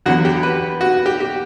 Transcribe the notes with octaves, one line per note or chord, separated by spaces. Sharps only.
E2 D3 F#3 F#4
G4
B4
F#4
G4
G4